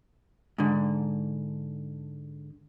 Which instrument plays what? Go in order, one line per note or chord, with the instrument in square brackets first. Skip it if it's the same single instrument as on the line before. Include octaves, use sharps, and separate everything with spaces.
[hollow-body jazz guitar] G#2 D3